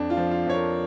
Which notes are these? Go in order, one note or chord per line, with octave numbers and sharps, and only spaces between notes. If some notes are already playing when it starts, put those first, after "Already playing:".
Already playing: F2 D4
F4
F3
F4
F2 C#5
A#4